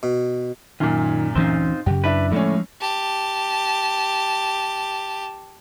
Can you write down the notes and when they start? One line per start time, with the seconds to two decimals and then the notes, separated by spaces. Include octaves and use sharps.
0.03 B2
0.80 F#2 A#2 D#3 F4
1.35 D2 E3 C4 C#4 D#4 F4
1.86 F#2 C#3 G4
2.04 D4 E4 B4 E5
2.32 A2 D3 F3 G#3 A3 C#4
2.81 G4 A5